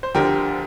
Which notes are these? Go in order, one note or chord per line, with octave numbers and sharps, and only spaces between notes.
C5
D2 D3 F3 G4 A#4